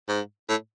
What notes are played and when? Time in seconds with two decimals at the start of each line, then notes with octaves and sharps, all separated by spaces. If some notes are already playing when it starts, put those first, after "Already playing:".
0.08 G#2
0.49 A2